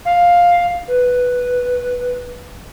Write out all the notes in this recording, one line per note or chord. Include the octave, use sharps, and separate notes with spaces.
F5
B4